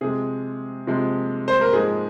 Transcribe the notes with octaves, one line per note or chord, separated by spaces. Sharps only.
C3 F3 G#3 G#4
C3 F3 G#3
C5
A#4
G#2 F3 G#3 G#4